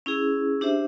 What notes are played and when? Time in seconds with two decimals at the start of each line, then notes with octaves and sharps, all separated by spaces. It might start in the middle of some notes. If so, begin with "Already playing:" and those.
0.06 C#4 E4 G#4
0.61 D4 G4 C5 E5